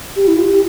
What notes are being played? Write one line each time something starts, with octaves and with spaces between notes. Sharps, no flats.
G4
E4
F4
G4